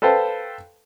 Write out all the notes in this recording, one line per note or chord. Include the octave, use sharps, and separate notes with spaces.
A4 B4 C5 F5 G5 A5